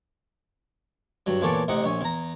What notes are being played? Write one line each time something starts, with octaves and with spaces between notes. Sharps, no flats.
G2 F#3
E2 A#2 E3 A4 C#5 D5
A1 C3 D#4 F#5
A#1 C#5 G#5
E2 A#5